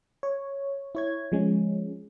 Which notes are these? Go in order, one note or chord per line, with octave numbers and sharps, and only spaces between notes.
C#5
E4 C#5 G#6
F3 G#3 C#4